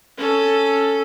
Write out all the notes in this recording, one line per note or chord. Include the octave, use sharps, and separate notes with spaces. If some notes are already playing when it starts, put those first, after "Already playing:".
C#4 A4